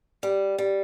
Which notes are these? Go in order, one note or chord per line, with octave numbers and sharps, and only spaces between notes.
G3
G3